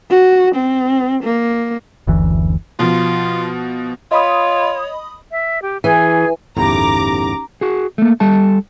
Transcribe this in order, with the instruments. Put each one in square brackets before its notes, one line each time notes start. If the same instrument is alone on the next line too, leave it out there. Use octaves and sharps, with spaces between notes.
[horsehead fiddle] F#4
C4
A#3
[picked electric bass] F#1 D2 E3
[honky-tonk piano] B2 F3 [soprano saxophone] F4
[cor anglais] F4 [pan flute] C#5 [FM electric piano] D#5 B5 D#6
[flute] E5
G4
[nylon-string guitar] E3 [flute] G#4 [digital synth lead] G#5
[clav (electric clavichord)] G1 E2 A2 [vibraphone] C#4 D#4 G4 [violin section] A#5 D6
[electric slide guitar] F#4 G#4
A3 A#3
G3 A4 A5